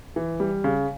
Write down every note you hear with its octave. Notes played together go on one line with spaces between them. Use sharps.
E3
G3
C#3